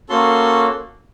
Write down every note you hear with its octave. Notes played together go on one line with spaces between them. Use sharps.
A#3 C#4 F#4 A4 C6